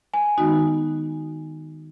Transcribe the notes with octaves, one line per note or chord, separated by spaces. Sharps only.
G#5
D#3 G#3 B3 D#4 F#4